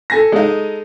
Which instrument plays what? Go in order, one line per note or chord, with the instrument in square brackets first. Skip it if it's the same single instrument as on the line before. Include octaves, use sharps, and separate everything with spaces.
[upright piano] A4 G#5 A#6
[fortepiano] G#3 D#4